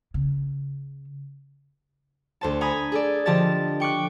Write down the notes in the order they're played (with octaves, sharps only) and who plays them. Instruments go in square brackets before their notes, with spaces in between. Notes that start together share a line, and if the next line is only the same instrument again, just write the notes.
[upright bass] C#3
[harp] D2 C5 A5
G#5 A#5 B5 D#6
G#4 A4 D5
D3 F3 G4 D#5 A5 A6
G5 C#6 D6 F#6